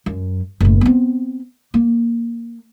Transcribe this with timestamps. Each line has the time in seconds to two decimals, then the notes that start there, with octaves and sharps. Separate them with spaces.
0.06 F#2
0.61 F#1 A2
0.81 B3 C4
1.74 A#3